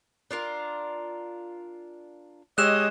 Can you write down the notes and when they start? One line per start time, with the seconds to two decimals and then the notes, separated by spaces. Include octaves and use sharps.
0.31 D4 F4 A#4
2.58 G#3 G4 C#5 D#5 E6 F#6 E7